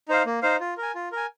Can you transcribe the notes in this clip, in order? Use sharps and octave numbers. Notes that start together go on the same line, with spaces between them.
D#4 C5 F5
A#3
D#4 C5 F5
F4
A#4 G#5
F4
A#4 G#5